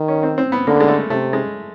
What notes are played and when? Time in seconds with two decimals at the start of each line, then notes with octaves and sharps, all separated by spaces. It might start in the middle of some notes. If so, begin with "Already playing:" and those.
Already playing: D#3
0.08 C#4
0.23 C4
0.38 C4
0.52 B3
0.67 D3 A#3
0.80 G#3
0.88 A3
1.10 C3 A3
1.33 G#3